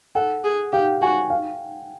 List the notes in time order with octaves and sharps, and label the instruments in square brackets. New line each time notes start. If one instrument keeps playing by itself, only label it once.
[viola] A4 [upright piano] F#5
[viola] G#4
[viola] G4 [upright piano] F5 G5
[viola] F#4 [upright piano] F#5 G#5
[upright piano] F5